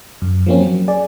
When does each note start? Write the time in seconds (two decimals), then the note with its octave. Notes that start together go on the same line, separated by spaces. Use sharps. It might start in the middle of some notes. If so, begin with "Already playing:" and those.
0.22 F#2
0.46 F3 F#3 A#3 C4 C#4
0.61 F#3
0.88 G#4 D5